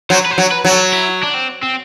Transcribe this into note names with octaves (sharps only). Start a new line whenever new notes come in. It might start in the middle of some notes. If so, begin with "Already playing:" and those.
F#3 C5
B4
C5
F#3
B4
F#3
A4
E4
D4
C4
C4